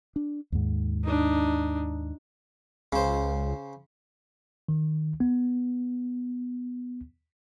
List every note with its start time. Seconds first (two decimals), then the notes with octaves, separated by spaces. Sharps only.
0.16 D4
0.52 D#2 G#2
1.04 D4 D#4
2.93 C#2 C#3 C5
4.69 D#3
5.20 B3